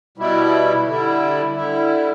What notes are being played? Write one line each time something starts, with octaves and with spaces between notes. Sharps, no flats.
B2 G3 E4
D3 G3 E4
D3 G3 E4